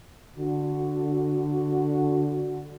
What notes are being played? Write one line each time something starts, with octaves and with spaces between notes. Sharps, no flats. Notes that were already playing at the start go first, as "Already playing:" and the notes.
D3 F#4